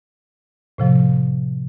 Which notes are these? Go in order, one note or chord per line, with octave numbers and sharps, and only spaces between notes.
A2 C3 F3